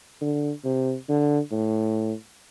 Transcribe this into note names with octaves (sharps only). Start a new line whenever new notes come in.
D3
C3
D3
A2